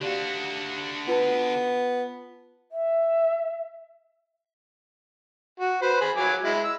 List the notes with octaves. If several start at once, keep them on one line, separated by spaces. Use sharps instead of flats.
D3 F#4 G4 D5 F5
B3 F4 B4 A5
E5
F#4
B4 C5
G#4 B5
F#3 G#5 D6
G#3 E4
E6